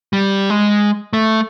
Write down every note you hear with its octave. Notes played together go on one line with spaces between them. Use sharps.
G3
G#3
A3